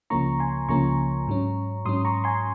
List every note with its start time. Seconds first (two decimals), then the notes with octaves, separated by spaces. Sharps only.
0.10 C#2 C#3 F3 A#3 C#4 A#5 C#6
0.39 G#5 C6
0.69 C#2 C#3 F3 A#3 C#4 A#5 C#6
1.27 G#2 F#3 C#4
1.85 G#2 F#3 C#4 C6 D#6
2.05 A#5 C#6
2.24 G#5 C6